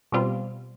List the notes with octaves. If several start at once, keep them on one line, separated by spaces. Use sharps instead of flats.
B2 G3 C4 F4